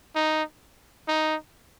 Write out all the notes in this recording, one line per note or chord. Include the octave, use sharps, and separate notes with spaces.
D#4
D#4